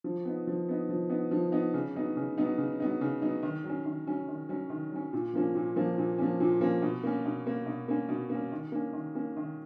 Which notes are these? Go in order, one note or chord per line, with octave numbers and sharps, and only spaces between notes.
F3
B3 D#4
F3
B3 D#4
F3
B3 D#4
F3
B3 D#4
C#3
F#3 B3 D#4
C#3
F#3 B3 D#4
C#3
F#3 B3 D#4
C#3
F#3 B3 D#4
D#3
F#3
C#4
D#3
F#3 C#4
D#3
F#3 C#4
D#3
F#3 C#4
A#2
F3 A#3 C#4
A#2
F3 A#3 C#4
A#2
F3 A#3 C#4
A#2
F3 A#3 C#4
B2
A#3 C#4
B2
A#3 C#4
B2
A#3 C#4
B2
A#3
C#4
D#3
A#3 C#4
D#3
A#3 C#4
D#3